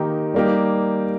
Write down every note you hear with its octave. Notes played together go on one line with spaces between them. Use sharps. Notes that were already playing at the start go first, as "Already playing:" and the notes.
Already playing: D#3 A#3 D#4 G4
G3 A#3 D#4 G4